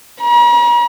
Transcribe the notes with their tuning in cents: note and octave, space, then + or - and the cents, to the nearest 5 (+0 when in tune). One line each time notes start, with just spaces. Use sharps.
A#5 +45